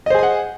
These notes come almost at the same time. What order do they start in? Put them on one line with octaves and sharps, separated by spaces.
D#5 C5 G#4 G#5 F#5